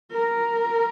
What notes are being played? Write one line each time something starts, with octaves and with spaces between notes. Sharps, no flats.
A#4